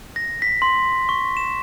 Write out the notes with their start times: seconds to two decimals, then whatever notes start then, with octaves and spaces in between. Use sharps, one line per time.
0.16 A#6
0.42 B6
0.62 C6
1.09 C#6
1.37 E7